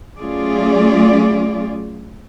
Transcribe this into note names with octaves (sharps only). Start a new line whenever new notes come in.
F#3 A3 C#4 F4 G#4 D5